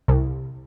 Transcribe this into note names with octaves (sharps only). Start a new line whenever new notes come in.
C2